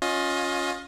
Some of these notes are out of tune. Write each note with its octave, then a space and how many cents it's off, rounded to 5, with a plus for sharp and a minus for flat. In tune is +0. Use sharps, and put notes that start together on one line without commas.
C#4 +0 F4 +25 D#5 +10